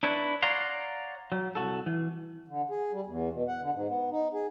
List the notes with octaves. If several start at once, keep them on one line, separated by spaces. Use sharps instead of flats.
D4 E4 B4 C#5
C#5 D5 F5 F#5 A#5 C6
F#3
C2 F#4 A4
E3
D3
G#4
G3
E2
B2
F#5
D3
G#2
B3
D#4
G#4